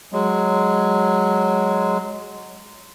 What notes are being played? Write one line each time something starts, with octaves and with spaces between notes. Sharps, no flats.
F#3 G#3